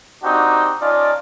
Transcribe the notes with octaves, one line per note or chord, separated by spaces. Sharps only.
C4 D4 D#4 F#4 G4
C#4 D#4 F4 D5 D#5 A5